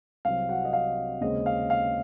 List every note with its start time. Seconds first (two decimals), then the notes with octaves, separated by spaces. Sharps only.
0.25 C2 C3 F#3 C4 F5
0.49 F#4 F#5
0.65 D#5
0.73 F5
1.21 D#2 C#3 G#3 C4 D#5
1.46 F5
1.70 F5